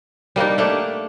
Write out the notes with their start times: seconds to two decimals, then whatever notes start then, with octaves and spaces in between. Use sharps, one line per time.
0.36 G3 A#3 D4 D#4
0.58 A3 A#3 D4